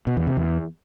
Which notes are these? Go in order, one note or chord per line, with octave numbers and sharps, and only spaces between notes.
B2
E2
C3
E2